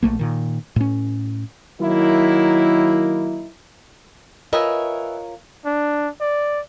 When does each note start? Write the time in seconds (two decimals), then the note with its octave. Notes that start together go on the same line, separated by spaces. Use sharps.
0.03 A#1 D#2 A3 A#3
0.19 A#2 D#3
0.76 A2 C#4
1.81 D#3 F#3 A#3 D#4 E4
4.53 F4 A#4 B4 C#5 D#5 E5 G#5
5.65 D4
6.21 D5